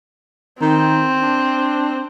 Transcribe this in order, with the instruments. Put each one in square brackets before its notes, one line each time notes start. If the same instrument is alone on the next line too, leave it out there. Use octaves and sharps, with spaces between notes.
[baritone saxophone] D#3 [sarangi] C4
[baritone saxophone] D4